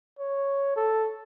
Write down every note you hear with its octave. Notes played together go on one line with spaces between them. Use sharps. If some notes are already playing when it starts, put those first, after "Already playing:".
C#5
A4